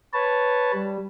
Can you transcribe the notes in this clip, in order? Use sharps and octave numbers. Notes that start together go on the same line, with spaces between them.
B4 C#5 A5
G3